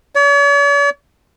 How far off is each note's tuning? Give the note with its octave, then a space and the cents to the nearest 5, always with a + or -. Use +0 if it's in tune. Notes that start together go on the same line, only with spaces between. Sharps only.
C#5 +45